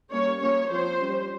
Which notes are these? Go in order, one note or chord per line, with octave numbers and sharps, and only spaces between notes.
G3 A#3 C#4 C#5
F3 A#3 C#4 C#5
F3 C4 C5
G3 C#4